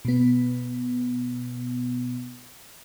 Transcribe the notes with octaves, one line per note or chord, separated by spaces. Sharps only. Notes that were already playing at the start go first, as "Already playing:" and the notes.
B2 B3